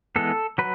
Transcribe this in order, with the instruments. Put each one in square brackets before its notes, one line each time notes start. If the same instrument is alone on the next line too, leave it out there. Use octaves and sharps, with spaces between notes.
[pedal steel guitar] E3 G#3 B3 A4
F#3 B4